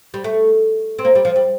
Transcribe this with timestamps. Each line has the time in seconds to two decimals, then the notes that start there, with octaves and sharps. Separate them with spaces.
0.14 G3
0.24 A3
0.99 C4
1.05 A#3
1.15 G3
1.25 F3
1.36 G3